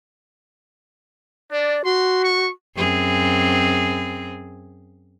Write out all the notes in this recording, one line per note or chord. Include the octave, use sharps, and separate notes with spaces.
D4 D5
F#4 C6
C#6
F#2 C4 G#4